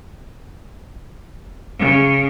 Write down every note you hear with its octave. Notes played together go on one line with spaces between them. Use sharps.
C#3